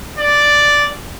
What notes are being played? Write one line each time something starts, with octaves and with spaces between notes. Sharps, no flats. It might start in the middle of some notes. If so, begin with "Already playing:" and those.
D5